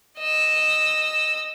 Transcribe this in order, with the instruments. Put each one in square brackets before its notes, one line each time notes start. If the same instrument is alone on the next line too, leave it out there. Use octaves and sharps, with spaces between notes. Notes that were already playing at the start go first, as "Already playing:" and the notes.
[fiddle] D#5 E6